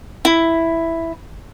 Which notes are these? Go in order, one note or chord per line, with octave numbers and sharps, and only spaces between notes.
E4